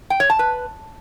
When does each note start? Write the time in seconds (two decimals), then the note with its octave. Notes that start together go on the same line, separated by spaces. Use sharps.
0.10 G5
0.20 C#5
0.30 A5
0.39 B4